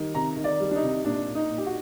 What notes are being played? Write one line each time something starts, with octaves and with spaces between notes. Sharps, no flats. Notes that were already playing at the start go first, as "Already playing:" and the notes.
Already playing: D#3 G3
C3 A#5
D#3
D5
G3
D4
D#4
C3
A#2 D4
A#2
D#4
A#2
G4
F#4